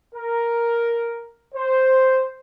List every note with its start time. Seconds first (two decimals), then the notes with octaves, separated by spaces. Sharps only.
0.15 A#4
1.55 C5